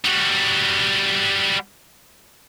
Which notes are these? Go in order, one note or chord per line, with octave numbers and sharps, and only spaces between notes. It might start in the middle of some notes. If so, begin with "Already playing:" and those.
G3 F#4